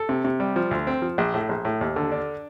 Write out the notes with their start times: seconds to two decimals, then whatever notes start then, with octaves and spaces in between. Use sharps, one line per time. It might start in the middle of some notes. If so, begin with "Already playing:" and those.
Already playing: A4
0.09 C3
0.24 C3
0.40 G3
0.56 F3
0.71 D2
0.87 C4
1.02 F3
1.18 A#1
1.34 A2
1.49 A#1
1.65 A2
1.81 D#2
1.96 D3
2.12 D4